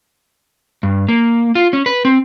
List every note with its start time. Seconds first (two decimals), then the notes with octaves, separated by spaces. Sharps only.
0.83 G2
1.09 A#3
1.55 F4
1.73 C#4
1.86 B4
2.05 C4